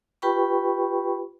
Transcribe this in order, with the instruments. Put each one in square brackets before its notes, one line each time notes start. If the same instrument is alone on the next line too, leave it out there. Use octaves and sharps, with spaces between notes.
[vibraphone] F4 G4 B4 G5 B5 C#6